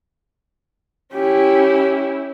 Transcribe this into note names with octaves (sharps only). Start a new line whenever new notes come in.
C#4 E4 G4